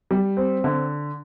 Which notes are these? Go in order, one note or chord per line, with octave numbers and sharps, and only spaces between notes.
G3
C4
D3